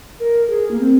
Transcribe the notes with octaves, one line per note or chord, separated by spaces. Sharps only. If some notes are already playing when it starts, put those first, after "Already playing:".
A#4
G#4
A#3
C4